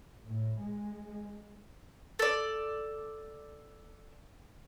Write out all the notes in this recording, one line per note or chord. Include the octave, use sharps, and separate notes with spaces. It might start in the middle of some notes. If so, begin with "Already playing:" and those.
A2
G#3
A4 D5